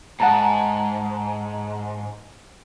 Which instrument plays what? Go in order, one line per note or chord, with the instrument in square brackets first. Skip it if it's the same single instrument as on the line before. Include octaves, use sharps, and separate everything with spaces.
[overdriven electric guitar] G#2 [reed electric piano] F#5 A5 A#5